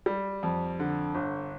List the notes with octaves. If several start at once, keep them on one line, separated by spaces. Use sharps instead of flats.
G3
F2
D3
G1